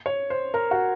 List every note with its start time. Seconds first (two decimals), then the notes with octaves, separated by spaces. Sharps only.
0.06 C#5
0.30 C5
0.54 A#4
0.71 F#4